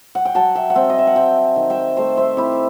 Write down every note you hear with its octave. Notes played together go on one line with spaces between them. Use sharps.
F#5
G5
F#3 F#5 A5
E5 G5
F#5
C4 E5 G5
D#5
E5
F#5
C4 E5 G5
D#3
E5 G5
A3 C5 E5
C5 E5
C4 E4 G4